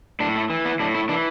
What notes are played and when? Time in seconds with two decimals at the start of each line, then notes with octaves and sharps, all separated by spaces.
0.20 A2 D4
0.36 A3
0.50 E3
0.65 B3
0.80 A2 D4
0.95 E4
1.09 E3 D4